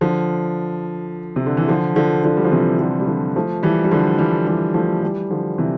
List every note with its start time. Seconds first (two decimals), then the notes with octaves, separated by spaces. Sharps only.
0.01 D3 F3
1.36 C3
1.46 D3
1.57 E3
1.68 D3 F3
1.96 D3 F3
2.24 D3 F3
2.37 G3
2.44 F3
2.52 C3 E3
2.79 D3 F3
3.00 G3
3.08 D3 F3
3.36 F3 A3
3.63 E3 G3
3.84 G3
3.91 D3 F3
4.18 E3 G3
4.47 E3 G3
4.74 F3 A3
5.03 E3 G3
5.30 D3 F3
5.58 C3 E3